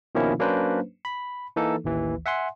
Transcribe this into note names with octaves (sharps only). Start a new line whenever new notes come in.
B2 D#3 F3 A#3 C#4 E4
F#3 A#3 C#4 D4 B4 C5
B5
E3 A#3 D#4 A4
A1 D#2 E3
E5 F#5 G#5 C6